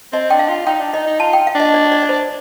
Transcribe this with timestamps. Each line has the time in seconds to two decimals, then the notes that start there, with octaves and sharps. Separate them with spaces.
0.12 C4 D#5
0.30 D4 G5
0.39 F5
0.49 F4
0.67 D#4 G5
0.80 D4
0.93 D#4 D#5
1.07 D#4
1.20 F4 A5
1.33 G5
1.47 F5
1.55 D4 D#5
1.74 D5
1.92 D5
2.03 D5
2.09 C5